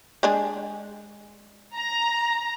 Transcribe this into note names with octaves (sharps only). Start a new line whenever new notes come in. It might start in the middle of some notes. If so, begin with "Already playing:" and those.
G#3 D4 G#4
A#5